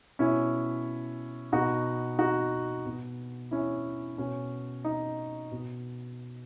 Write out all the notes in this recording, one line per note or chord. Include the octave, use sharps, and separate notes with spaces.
B2 C#4 E4
B2 D#4 F#4
D#4 F#4
B2
C#4 E4
B2 C#4
D#4
B2